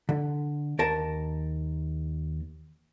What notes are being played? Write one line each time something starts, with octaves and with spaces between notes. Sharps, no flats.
D3
D#2 A#4 A5